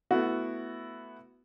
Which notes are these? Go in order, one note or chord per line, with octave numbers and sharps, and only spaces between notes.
A3 B3 E4 F#4